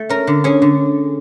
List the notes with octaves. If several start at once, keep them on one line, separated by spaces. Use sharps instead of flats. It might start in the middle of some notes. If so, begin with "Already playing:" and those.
Already playing: A3
C#4 A#4
D3
C#4 G#4
D3